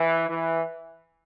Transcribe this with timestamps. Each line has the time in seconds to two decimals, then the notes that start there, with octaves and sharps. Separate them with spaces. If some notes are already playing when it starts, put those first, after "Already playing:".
Already playing: E3
0.29 E3